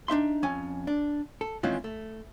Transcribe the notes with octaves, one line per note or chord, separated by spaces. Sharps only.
D4 D#4 E5 C6
F2 C#4 G#5
D4
A4
D#3 E3 G#3 C4 C#4 F4
A3